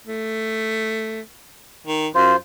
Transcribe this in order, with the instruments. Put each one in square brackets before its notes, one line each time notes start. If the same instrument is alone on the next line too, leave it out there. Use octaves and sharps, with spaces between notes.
[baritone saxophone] A3
D#3
[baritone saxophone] F#2 [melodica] F4 C5